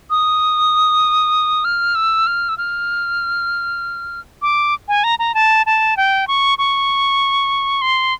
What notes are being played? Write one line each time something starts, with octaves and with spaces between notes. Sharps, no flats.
D#6
F6
E6
F6
E6
F6
D6
G#5
A#5
A#5
A5
A5
G5
C#6
C#6
C6